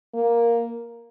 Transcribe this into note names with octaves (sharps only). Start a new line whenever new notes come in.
A#3